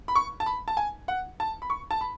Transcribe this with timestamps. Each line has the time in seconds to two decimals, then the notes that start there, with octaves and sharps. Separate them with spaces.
0.08 B5
0.15 C#6
0.40 A5
0.46 B5
0.68 A5
0.77 G#5
1.08 F#5
1.40 A5
1.62 B5
1.70 C#6
1.91 A5
2.01 B5